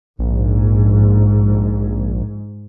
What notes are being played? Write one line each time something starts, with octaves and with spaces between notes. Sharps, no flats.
A#1 G#2